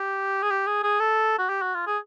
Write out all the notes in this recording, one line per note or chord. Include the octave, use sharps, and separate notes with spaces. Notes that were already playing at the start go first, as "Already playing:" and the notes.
Already playing: G4
G#4
G4
G#4
G#4
A4
F#4
G4
F#4
F4
G#4